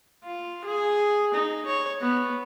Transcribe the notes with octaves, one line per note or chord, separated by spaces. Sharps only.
F4
G#4
D#4
C#5
B3